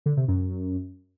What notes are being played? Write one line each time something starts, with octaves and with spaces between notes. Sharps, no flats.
D3
C3
F#2